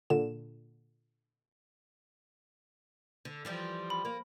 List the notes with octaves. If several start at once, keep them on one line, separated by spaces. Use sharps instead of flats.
A#2 D3 E7
D3
E3 F3 G3
B5
A#3